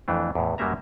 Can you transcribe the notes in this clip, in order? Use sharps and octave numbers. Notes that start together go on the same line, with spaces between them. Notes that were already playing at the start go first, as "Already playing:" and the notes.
F2 E3 A3 D4
E2 A2
F#2 F#3 G3 A#3 E5 A#5